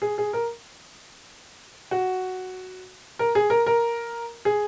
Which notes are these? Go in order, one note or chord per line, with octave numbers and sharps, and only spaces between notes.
G#4
G#4
A#4
F#4
A#4
G#4
A#4
A#4
G#4